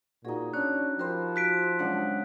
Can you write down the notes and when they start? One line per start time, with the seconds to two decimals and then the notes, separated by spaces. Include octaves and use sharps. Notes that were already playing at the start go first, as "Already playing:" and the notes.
0.25 A#2 D#4 F#4 G#4
0.54 C#4 D4 C#5 F#6
0.99 F3 G4 A#4 C5 B5
1.36 F#4 F#6 B6 D7
1.79 C#3 F#3 G#3 D4 F#5